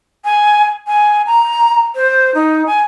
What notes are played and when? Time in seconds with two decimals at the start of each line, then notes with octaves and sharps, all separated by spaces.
0.25 G#5
0.87 G#5
1.26 A#5
1.96 C5
2.35 D#4
2.67 G#5